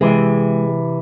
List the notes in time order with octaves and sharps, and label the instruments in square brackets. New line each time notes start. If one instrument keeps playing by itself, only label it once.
[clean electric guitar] C3 E3 [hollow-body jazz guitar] G#3